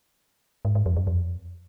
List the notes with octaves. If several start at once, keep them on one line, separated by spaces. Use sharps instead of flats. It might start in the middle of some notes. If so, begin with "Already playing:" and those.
G#2
G#2
F2
F#2
F2